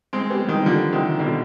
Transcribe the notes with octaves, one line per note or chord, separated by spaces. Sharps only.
G#3 C4
G3 B3
D#3 G3
D3 F3
C3 D#3
B2 D3